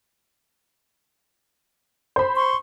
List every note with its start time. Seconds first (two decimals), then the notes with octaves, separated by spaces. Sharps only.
2.16 C5 B5
2.35 C6 C#6